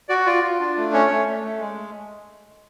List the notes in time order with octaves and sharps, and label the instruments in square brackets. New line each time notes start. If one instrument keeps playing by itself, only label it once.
[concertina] F#4 D5
F4 D5
F4
D4
A3
C#4 C#5
A3
A3
A3
G#3